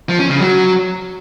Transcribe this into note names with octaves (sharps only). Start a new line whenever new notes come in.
F3
C#4
C#3
F#3